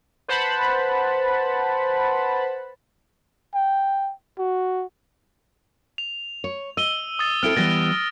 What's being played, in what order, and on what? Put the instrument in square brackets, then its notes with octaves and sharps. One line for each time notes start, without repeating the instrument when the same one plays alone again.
[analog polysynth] B4 C5 F#5 A5 B5
[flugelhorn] G5
F#4
[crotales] F7
[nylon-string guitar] C#5
[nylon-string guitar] D#5 [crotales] E6 D#7 G7
[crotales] D#6 A6
[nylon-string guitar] C4 E4 A4 [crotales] F6 D7
[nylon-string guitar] E3 G3 B3 [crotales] A6 A#6 G7